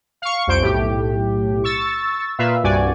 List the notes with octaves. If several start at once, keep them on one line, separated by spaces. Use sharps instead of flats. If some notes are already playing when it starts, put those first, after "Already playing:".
F5 C#6
C2 F2 C5 G6 D7
B1 A2 G4
C#6 E6 A6
A#2 B4 E5 F5
C2 G2 F#4 D5 G#5